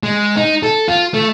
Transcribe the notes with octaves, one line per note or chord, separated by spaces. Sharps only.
G#3
D#4
A4
F4
A3